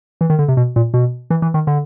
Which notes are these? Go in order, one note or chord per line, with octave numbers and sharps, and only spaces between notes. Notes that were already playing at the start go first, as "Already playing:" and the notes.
E3
D#3
D3
C3
B2
A#2
B2
E3
E3
D#3
D3